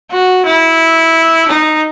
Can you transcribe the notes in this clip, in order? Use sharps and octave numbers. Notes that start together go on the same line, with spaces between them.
F#4
E4
D#4